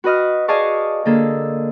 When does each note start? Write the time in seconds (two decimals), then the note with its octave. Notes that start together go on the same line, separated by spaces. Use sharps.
0.04 F#4 B4 D#5 F6
0.48 G#4 D5 D#5 F5 A5 C#6
1.05 D3 A#3 G#4 A4